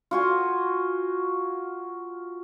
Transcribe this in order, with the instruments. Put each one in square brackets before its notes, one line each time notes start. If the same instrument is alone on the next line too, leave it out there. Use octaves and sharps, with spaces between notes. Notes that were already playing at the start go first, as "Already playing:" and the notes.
[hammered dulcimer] F4 F#4 G#5